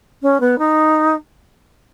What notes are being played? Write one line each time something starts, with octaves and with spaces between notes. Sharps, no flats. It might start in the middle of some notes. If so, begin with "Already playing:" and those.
C#4
B3
D#4